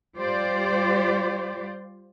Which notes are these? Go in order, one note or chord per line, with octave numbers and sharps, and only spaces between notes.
G3 F4 G4 C5 D5